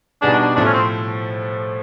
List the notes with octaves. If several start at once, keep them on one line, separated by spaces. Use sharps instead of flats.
B2 G3 B3 D4 D#4 G#4
D4
A2 F3 A3 D4
C#4
C4